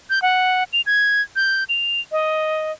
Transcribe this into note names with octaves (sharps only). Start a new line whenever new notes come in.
G6
F#5
F7
G#6
G6
F7
D#5